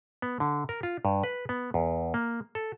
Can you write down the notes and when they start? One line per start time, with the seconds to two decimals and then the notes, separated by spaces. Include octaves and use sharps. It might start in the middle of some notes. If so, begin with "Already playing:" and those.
0.22 B3
0.40 D3
0.69 A#4
0.83 F4
1.05 G2
1.24 B4
1.49 B3
1.74 E2
2.14 A#3
2.55 A4